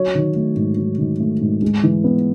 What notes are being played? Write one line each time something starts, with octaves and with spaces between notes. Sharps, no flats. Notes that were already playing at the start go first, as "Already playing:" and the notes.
Already playing: F#3 C#5
D#3
A3
G#2
F#3
D#3
A3
G#2
G#3
E3
B3